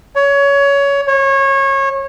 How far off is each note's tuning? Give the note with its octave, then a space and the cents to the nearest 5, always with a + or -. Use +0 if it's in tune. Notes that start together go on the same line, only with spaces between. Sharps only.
C#5 +20
C#5 -25